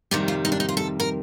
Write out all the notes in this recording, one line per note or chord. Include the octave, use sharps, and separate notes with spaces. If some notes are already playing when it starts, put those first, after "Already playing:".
F2 C3 D#3 G3 G4
F4
D#4
D4
D#4
F4
A4
A#4